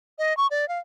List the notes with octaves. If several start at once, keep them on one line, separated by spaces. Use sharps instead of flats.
D#5
C#6
D5
F5